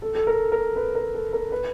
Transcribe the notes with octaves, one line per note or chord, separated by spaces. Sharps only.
A4
A4
A#4
A#4
B4
A#4
A4
A#4
B4